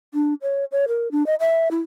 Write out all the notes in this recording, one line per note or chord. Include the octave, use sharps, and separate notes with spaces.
D4
C#5
C#5
A#4
D4
D#5
E5
E4